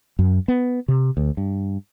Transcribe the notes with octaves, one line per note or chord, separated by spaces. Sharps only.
F#2
B3
C3
D2
G2